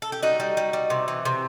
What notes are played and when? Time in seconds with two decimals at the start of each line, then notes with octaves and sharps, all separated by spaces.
0.02 A4
0.12 G4
0.23 G3 D#4 F#4
0.40 G3
0.57 G3
0.73 G3
0.90 C3
1.08 E3
1.25 C3